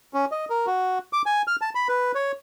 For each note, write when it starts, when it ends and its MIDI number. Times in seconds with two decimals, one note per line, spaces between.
0.14 0.25 61
0.32 0.45 75
0.50 0.66 70
0.66 0.99 66
1.13 1.22 86
1.26 1.42 80
1.47 1.56 89
1.61 1.70 81
1.75 1.88 83
1.89 2.12 71
2.15 2.32 73